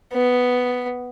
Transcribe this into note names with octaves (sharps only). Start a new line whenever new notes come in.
B3